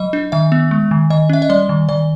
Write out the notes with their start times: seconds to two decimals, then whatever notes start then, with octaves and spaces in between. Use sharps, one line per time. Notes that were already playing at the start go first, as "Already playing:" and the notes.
Already playing: F#3 D#5
0.13 D4
0.32 D#3 E5
0.52 B3
0.71 G#3
0.91 D#3
1.10 D#3 D#5
1.29 C#4 E5
1.42 D#5
1.49 G3 D5
1.69 D#3
1.89 D#3 D5